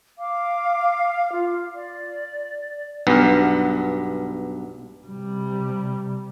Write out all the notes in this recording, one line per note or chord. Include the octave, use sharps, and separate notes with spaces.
F5 D6
F4
D5
B1 G2 B3
C3 G3